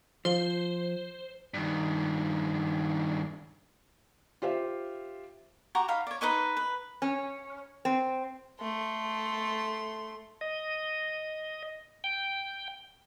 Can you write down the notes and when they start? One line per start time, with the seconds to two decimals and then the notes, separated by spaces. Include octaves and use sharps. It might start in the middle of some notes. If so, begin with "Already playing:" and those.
0.25 F3 C5
1.54 G2 D#3
4.42 F4 G4 C5 E5 F5
5.75 F#4 G4 A#5 C#6
5.88 D#4 F5 B5
6.07 C#5 D5
6.21 D#4 B4 D#5 C#6
6.57 B4
7.02 C#4
7.85 C4
8.60 A3 C6
10.41 D#5
12.04 G5